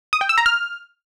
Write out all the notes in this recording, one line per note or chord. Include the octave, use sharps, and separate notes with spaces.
D#6
G5
E6
A#5
F6